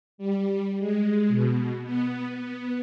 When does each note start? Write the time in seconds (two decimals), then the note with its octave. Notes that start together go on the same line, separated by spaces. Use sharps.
0.18 G3
0.78 G#3
1.28 B2
1.83 B3
2.33 B3